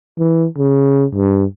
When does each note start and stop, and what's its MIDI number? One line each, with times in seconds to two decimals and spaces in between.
0.19 0.46 52
0.58 1.05 49
1.15 1.44 43